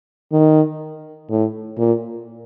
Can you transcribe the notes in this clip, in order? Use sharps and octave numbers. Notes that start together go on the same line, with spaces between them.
D#3
A2
A#2